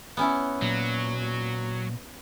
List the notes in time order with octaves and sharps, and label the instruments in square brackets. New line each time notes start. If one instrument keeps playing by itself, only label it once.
[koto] B3 C#4 E4
[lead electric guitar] A#2 [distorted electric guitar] F#3